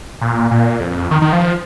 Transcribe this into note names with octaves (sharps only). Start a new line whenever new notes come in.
A#2
A#2
F2
D#3
D#3
F3